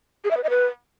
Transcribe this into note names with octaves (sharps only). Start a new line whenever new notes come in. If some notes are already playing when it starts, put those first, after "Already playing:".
G#4
E5
B4
D#5
B4